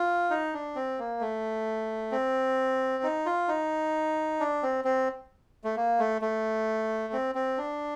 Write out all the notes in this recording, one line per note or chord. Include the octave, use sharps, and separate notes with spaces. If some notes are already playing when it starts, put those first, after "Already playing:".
Already playing: F4
D#4
D4
C4
A#3
A3
C4
D#4
F4
D#4
D4
C4
C4
A3
A#3
A3
A3
C4
C4
D4